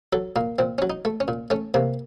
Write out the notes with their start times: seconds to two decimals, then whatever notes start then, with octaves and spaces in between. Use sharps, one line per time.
0.13 F#3 A4
0.36 A#2 A#3
0.59 A#2 C4
0.78 F#3 C#4
0.90 D#4
1.05 A3
1.20 C#4
1.28 A#2
1.50 A3 C#4
1.74 C3 A#3